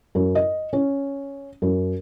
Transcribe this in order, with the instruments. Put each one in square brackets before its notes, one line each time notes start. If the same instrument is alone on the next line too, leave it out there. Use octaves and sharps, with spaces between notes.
[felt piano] F#2
D#5
C#4
F#2